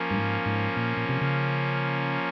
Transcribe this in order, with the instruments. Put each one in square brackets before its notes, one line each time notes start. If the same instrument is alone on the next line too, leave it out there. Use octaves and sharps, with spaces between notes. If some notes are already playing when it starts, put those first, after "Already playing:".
Already playing: [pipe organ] F3 A#3 C#4
[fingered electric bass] G2
G#2
G#2
A#2
A#2
C3
C#3